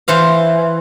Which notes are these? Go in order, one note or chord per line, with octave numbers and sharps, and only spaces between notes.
E3 C5 F5